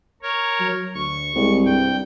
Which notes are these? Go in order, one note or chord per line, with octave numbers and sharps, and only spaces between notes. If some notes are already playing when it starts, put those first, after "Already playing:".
A#4 C#5
F#3
D2 C#6
C2 G#3
G2 G5